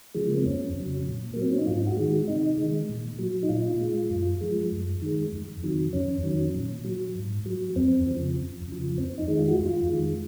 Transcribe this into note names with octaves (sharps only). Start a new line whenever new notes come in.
C#3 F3 G#3
A#3
C4
F2 C#4
C#3 F#3
A#2
F#3 A#3
C4
C#4
D#4
G#2 F4
F#4
D#3 G#3
F#4
C3 D#4
D#3 G#3
A#2
F#3
D#4
A#2 F4
G#3
F#2
F3 G#3
F#2
D#3 G#3
F2
C3 D#3 F#3
F2 C#4
D#3 F#3
A#2
F#3
G#2
F#3
F2 C4
C#3 F3
F2
C#3 F3
F2 C4
D#4
D#3 G#3
F4
F#4
F2 F4
D#3 G#3